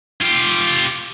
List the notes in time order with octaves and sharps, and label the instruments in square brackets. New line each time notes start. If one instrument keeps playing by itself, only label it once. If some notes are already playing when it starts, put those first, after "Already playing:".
[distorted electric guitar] F4 G4